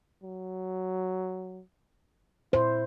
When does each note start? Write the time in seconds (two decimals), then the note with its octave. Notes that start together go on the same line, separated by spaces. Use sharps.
0.23 F#3
2.53 A#2 E4 C5